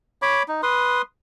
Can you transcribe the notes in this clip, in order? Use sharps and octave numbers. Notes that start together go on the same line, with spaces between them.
C#5 B5 D6
D#4
B4 C6 D#6